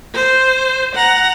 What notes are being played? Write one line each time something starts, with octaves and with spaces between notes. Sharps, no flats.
C5
F#5 A#5